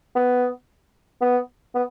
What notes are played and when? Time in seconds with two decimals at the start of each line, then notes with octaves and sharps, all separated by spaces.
0.16 B3
1.22 B3
1.75 B3